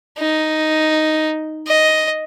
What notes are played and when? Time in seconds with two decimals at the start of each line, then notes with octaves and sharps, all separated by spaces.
0.18 D#4
1.67 D#5